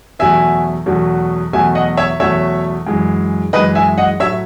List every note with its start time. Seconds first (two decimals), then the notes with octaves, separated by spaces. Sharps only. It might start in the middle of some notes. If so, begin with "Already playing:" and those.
0.19 E2 B2 F#3 A3 E5 G#5
0.86 E2 B2 F#3 A3
1.53 E2 B2 F#3 A3 E5 G#5
1.75 D#5 F#5
1.97 C#5 E5
2.20 E2 B2 F#3 A3 C#5 E5
2.87 F#2 E3 G#3
3.53 F#2 E3 G#3 B4 D#5
3.75 E5 G#5
3.98 D#5 F#5
4.20 A2 F#3 A3 C#5 E5